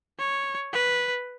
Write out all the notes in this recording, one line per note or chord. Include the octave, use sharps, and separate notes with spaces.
C#5
B4